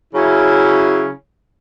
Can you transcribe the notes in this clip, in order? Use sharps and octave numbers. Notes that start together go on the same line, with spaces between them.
C#3 F#3 C#4 E4